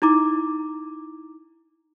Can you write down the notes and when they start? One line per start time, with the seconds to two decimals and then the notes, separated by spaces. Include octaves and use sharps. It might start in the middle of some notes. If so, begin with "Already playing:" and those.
0.02 D#4 E4 A#5 D6